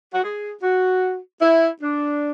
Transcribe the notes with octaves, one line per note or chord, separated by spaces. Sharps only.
F#4
G#4
F#4
E4
D4